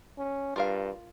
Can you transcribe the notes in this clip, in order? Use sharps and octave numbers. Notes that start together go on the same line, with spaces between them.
C#4
G2 F4 A#4 F5